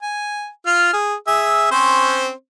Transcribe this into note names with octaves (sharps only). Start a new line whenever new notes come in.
G#5
F4 F6
G#4
G#4 E5 E6
C4 C#4 C5